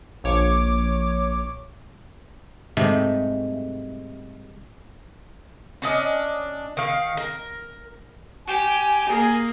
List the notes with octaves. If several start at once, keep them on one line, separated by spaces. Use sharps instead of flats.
A#1 C#5 D6
G#2 C3 D#3 G3 A3
C#4 D4 D#5
D#3 F5
A#4
G4 G#5
A#3 G#4